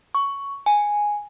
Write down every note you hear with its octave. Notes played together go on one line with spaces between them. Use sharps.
C#6
G#5